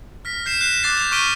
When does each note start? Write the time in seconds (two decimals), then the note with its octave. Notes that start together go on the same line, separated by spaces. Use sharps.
0.25 F6 A#6 B6
0.46 G6 C7 E7
0.61 F#6 C7 E7
0.83 D6 F#6 A6 C7
0.97 G6
1.12 C#6 F6 B6 D7 D#7 G7